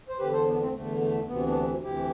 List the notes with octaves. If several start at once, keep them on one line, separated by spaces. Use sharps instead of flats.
C5
E2 D3 G4 B4
A4 C5
B3 D4
A3 C4
E2 D3 A3
A3
D2 C3 E3 B3
B3 D4
D2 C3 E3 E4 G4